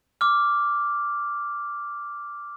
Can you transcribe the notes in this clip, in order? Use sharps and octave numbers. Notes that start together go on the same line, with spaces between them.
D6 F6